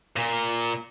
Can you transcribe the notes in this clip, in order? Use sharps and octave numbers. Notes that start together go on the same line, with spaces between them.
A#2